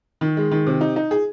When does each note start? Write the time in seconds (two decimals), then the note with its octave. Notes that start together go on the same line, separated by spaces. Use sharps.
0.21 D#3
0.37 G#3
0.51 D#3
0.67 C3
0.81 D#4
0.96 D#4
1.11 G#4